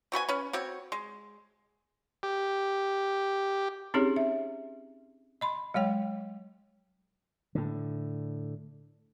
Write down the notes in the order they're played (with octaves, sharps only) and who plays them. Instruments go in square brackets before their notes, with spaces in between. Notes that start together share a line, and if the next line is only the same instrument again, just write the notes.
[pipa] C4 F#4 B4 G#5
C#4 B4
C4 F#4 C#5
G#3
[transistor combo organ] G4
[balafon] C4 C#4 D#4 G4 G#4 C#5
E5
D#5 B5 C6
F#3 G#3 C#5 G5
[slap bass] A2 D3